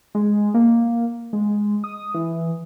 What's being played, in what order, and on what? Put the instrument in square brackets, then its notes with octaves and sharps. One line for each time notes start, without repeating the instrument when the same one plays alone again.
[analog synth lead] G#3
A#3
G#3
D#6
E3